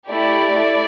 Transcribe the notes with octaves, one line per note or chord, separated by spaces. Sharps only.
A3 E4 G4 D5
A3 E4